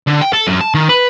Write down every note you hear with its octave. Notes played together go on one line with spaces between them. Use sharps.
D3
G5
A4
F#2
A5
D#3
B4